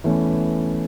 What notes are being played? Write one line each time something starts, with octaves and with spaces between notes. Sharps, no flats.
E2 E3 A3 C#4